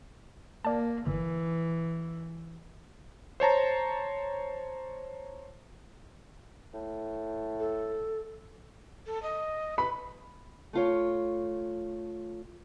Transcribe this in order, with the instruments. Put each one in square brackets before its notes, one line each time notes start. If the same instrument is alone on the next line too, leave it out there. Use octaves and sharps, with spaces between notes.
[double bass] A#3 [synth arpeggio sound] D5 A5
[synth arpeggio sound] G1 [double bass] E3
[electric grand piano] C5 C#5 A5 A#5
[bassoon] A2
[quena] A4
A4
D#5
[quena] B4 [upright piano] B5
[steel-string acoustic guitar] A3 F4 C#5